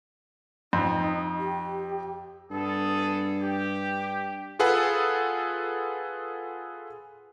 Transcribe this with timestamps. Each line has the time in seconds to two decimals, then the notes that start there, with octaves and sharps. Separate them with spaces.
0.73 F2 D#4
1.38 G4
2.50 G2 B3 G#4 A4
3.40 G4
4.59 F4 G#4 A4 B4 F#5